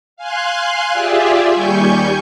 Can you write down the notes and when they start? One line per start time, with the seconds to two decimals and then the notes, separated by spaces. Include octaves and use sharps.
0.17 F5 G#5 C6 F#6
0.93 F4 G4 G#4 D5 E5
1.51 D#2 G3 G#5 C#6 G6